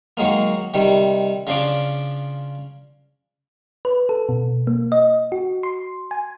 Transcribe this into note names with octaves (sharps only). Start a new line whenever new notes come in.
D#3 F#3 G#3 A#3
C3 D#3 G3
C#3 F3 D4 D6
B4
A4
B2
A#3
D#5
F#4
C6
G#5